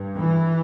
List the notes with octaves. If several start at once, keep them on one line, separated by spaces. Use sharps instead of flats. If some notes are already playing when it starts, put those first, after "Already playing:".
Already playing: G2
E3